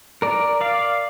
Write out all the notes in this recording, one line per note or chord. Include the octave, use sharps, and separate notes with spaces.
A#4 D5
D5 F5